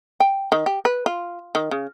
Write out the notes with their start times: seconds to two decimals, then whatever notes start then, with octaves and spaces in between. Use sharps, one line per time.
0.20 G5
0.52 D#3
0.66 G4
0.85 B4
1.06 F4
1.55 D#3
1.71 C#3